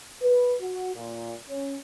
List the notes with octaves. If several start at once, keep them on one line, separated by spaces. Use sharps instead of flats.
B4
F#4
A#2
C#4